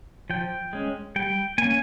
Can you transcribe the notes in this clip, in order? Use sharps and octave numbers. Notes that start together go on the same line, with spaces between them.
F3 G5
G#3 C#4
G3 G5
A#3 C#4 G#5